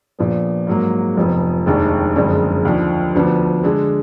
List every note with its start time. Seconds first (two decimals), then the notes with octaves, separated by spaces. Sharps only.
0.19 A#1 A#2 F3 B3
0.67 G#2 F#3 A#3
1.17 F1 F2 F3 B3
1.66 F1 D#2 D#3 G#3 D4
2.15 F#1 F2 D3 G#3
2.65 D#2 D3 F3
3.15 D2 D3 F3 B3 D4
3.63 D3 G#3 D4 G#4